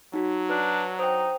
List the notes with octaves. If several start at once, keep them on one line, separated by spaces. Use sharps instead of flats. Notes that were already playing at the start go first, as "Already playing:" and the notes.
F#3 D#4 F#4
D4 B4
D#4 C5 G5